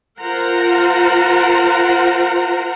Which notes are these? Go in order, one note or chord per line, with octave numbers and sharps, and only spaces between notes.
F4 A#4 C5 F#5 A#5